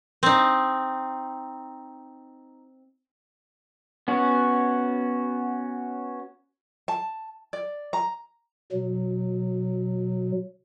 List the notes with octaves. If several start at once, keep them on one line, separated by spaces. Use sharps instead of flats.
C4 D#4
B3 C#4 F#4
A5
D5
A#5
B2 F#3